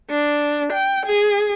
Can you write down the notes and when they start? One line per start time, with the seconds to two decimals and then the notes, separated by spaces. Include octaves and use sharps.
0.10 D4
0.73 G5
1.07 G#4